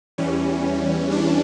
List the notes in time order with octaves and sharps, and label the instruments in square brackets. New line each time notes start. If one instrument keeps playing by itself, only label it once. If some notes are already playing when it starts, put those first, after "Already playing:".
[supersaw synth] E2 E3 G3 C#4
D4